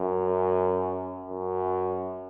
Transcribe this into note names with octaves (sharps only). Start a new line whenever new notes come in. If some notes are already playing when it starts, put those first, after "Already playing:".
Already playing: F#2
F#2